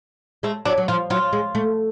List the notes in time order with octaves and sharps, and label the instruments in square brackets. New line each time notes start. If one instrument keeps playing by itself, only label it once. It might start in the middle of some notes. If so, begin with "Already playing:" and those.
[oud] G#3 [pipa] A3
[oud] F#3 [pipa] D4
[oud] F#3
[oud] F3 [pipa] F4
[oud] F#3 [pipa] F4
[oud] G#3
A3